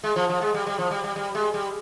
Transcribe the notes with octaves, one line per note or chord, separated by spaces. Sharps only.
G#3
F3
F3
G#3
G3
G3
F3
G3
G3
G3
G#3
G3